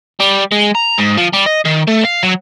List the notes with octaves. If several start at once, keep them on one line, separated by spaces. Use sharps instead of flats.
G3
G#3
A#5
G#2
F3
G3
D#5
D#3
A3
F5
F#3